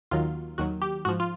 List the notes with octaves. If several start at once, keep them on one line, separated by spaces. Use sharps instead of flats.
D#2 D#3 F#3 F4
D#2 D#3 F#3 F#4
G4
G#2 F3 F#4
F4